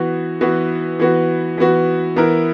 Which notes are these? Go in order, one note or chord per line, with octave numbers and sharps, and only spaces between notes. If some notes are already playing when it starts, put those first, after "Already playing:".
Already playing: E3 B3 F#4
E3 B3 F#4
E3 B3 F#4
E3 B3 F#4
E3 B3 E4 A#4